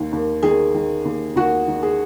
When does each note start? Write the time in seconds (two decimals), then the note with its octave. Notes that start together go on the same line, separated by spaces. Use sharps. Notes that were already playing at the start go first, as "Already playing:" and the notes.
Already playing: D#2 D#3
0.12 D#2
0.43 D#3 G#4
0.74 D#3
1.05 D#2
1.36 D#2 F#4
1.67 D#3
1.83 G#4